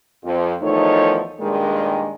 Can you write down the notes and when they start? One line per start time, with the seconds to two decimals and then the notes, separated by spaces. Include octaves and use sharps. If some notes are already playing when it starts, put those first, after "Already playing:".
0.24 F2
0.62 E2 D#3 F3 A3 D#4 C#5
1.40 G2 A#2 D#3 G#3